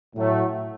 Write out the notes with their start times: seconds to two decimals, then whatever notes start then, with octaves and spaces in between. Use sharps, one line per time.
0.15 A2 F#3 A3